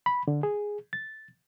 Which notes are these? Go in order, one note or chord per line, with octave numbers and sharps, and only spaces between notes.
B5
D3
G#4
A6